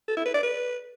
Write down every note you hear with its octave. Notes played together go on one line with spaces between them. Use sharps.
A4
E4
B4
D5
B4